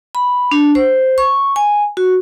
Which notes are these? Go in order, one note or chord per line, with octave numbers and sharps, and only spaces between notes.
B5
D4
C5
C#6
G#5
F#4